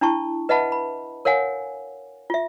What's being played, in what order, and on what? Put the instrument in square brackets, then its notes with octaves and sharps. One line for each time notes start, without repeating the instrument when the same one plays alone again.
[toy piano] D4 E4 A5 C#6
B4 D#5 E5 F#5 A5 B5
B5
A#4 C#5 F5 F#5 G#5
F4 E5